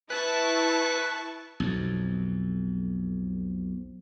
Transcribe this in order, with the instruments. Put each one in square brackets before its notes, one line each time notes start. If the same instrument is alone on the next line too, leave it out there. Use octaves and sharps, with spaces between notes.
[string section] E4 A5 C#6 [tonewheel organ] B4 F#6
[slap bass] B1 F2